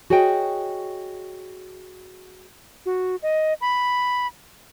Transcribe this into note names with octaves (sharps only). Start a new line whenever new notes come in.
F#4 G#4 C#5 D#5 G5
F#4
D#5
B5